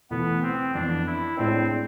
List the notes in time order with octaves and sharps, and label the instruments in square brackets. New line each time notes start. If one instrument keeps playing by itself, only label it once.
[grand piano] E2 B2 A3 E4 [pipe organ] B3
[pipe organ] C4
[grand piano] F2 E3 B3 [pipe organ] D4
[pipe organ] E4
[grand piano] A2 G#3 D4 [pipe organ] C4